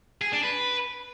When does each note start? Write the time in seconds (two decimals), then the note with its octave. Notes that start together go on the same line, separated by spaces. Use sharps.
0.21 G#4
0.32 D4
0.43 B4